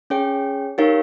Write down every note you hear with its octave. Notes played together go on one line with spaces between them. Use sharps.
C#4 G#4 C#5 G5
D#4 G4 A#4 C#5 F5